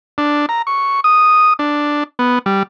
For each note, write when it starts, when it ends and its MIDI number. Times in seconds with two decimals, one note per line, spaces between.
0.18 0.46 62
0.49 0.62 82
0.67 1.00 85
1.04 1.53 87
1.59 2.04 62
2.19 2.39 59
2.46 2.63 55